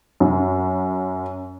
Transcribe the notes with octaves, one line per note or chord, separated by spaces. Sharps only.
F#2